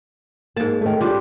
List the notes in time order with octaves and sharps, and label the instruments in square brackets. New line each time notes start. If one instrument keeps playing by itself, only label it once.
[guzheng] G#2 A5 [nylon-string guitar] A#3
[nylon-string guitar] D#3 A3
[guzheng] G3 D4 [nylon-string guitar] F4 G4